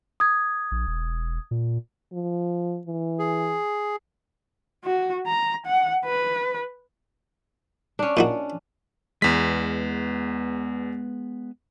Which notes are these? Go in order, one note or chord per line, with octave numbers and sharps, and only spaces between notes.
D#6 G#6
A#1
E1
A#2
F3
E3
G#4
F#4
A#5
F#5
B4
C#4 D4
A#2 D#4 F#4
E2 G#3 B3 B6